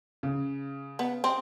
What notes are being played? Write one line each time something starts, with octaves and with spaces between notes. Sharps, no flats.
C#3
B3
C4